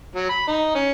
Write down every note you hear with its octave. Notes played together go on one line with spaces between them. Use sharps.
F#3
B5
D#4
C#4